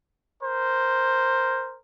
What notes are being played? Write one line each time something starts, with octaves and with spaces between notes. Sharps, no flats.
A#4 C5